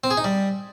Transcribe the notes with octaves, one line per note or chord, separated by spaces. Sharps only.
C4
G#4
D#4
G3